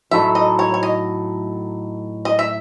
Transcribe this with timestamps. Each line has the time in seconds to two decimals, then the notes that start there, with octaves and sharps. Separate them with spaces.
0.11 A2 F#3 A3 D#4 A4 E5
0.35 D#5
0.59 C#5
0.74 C#5
0.83 D#5
2.25 D#5
2.39 E5